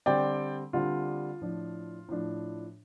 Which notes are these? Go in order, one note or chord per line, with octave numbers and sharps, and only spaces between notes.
D3 G3 C4 D5 G5
D3 G3 C4 F4
A2 F3 D4
A2 F3 D4